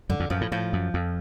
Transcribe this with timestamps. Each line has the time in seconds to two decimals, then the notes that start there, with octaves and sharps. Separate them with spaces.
0.09 F#2 D3
0.20 F2
0.30 F#2 F3
0.41 A2
0.52 A2 F3
0.73 F#2
0.94 F2